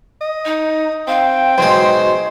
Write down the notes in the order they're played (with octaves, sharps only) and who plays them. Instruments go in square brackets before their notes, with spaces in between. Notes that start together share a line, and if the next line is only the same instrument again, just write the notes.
[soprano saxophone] D#5
[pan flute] D#4
[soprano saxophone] C4 [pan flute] F5 [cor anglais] G5
[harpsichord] B1 G#3 [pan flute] F#4 [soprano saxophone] C5